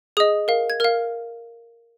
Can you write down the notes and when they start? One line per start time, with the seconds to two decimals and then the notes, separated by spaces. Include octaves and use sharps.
0.17 G#4 D#5 D#6
0.48 A#4 F5
0.70 G#6
0.80 A#4 F6
0.84 F5